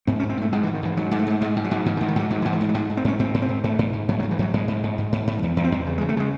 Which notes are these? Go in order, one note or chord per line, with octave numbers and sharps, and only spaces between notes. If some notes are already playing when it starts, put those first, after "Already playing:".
G#2 C4
C#4
G#2
C4
G#2 A3
G#2 G#3
E3
G#2
D#3
G#2 E3
G#2 F#3
G#2
A3
G#2
G#2 G#3
G#2
F#3
G#2
G#2 E3
D#3
G#2
D#3
G#2 F#3
G#2 F#3
E3
G#2
E3
G#2
F#3
G#2 G#3
G#2
C4
G#2 C#4
G#2 C4
G#2
C4
G#2
G#2 A3
G#2
G#2
G#2 F#3
F#3
G#2
E3
G#2 F#3
G#2 G#3
G#2
G#2
G#2
G#2
G#2
E2
E2
C4
E2
C#3
G#3
C#3
A3
C#3 G#3